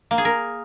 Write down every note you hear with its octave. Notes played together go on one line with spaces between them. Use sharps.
A#3
G#4
A#4